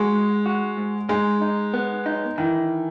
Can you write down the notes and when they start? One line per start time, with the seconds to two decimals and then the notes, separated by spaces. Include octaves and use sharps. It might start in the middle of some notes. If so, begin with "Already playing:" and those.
Already playing: G#3 F#4
0.13 G#2
0.46 F#4
0.77 G#2
1.09 G#3 D#4
1.42 D#4
1.74 B3
2.06 D#4
2.38 D#3 E3